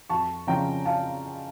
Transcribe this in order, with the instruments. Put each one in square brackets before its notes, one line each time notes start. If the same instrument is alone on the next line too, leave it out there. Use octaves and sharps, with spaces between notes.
[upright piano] F2 A5 C#6
C#3 F3 C#4 G5 A#5
F5 A5